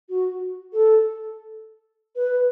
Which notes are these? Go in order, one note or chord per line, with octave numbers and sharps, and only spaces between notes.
F#4
A4
B4